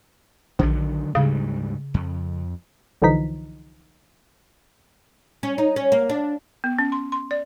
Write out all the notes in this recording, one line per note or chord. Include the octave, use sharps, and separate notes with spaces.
A#1 D3 D#3 F#3
D2 G#2 C#3 G3
F2
C2 D3 E3 F3 D#4 B6
C#4
D#4
C#4
A#3
D4
B3
C#4
C6
C6
D5